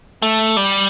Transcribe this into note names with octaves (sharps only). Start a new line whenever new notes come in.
A3
G3